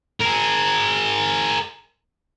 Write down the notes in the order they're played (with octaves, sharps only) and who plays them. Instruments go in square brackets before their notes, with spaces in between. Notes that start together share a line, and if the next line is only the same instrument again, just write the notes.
[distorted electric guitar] G#4 A#4